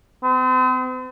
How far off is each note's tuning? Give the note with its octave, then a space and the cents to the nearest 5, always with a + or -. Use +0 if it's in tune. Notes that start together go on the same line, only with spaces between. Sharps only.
C4 -40